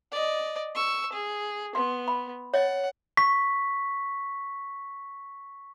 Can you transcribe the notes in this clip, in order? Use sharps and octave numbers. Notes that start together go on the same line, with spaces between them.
D5 D#5
C#6 E6
G#4
B3 C6
B5
C#5 D#5 F#5
C#6 B6